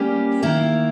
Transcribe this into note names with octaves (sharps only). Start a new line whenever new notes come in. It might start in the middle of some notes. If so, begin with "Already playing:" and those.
Already playing: G3 A#3 C#4 G4
D#3 A#3 E4